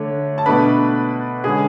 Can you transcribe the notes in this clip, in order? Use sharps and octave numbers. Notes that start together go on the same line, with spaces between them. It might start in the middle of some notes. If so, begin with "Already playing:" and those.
Already playing: D3 A3 D4 C#5
A5
B2 A3 D4 B4 B5
D3 G#3 C#4 G#4 G#5